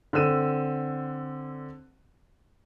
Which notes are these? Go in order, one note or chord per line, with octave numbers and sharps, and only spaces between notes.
D3 C4 E6 D#7